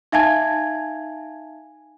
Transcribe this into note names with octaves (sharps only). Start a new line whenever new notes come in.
D#4 E5 F5 G#5 A5 G#6